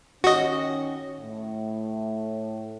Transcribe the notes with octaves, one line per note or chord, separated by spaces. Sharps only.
D#3 C#4 F#4 D#5
A2